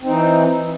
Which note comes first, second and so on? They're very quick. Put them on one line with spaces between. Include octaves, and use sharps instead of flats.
C4 D#4 E3